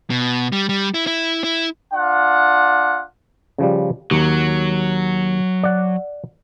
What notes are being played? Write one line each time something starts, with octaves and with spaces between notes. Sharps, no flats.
B2
G3
G3
E4
E4
E4
D4 F4 F#5
C#3 F3 G3
D#2 F#3
D5 F#5